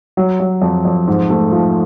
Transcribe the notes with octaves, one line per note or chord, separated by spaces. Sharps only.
F#3
F#3
F2
F2
G#2
A3
F3